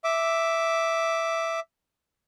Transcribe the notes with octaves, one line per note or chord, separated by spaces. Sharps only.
E5 D6